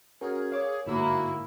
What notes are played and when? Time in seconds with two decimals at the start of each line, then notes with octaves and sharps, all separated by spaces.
0.21 C#4 F#4 G#4 A#4
0.52 C#5 F5 D6
0.86 G1 G#2 A#3 E4 F#4 E6